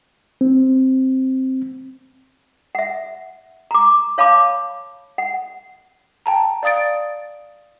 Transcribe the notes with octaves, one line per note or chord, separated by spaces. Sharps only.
C4
E5 F#5
A#5 D6
C#5 F5 A5 B5 D6
F#5
G5 A5 A#5
D5 F5 D#6 A6 D7